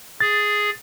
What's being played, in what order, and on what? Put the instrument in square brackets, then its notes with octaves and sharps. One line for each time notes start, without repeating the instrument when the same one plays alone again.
[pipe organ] G#4 [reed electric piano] A6